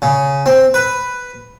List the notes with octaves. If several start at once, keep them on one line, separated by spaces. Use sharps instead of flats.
C#3
C4
B4